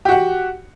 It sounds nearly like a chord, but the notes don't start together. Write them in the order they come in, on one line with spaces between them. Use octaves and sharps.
G4 F#4 F#5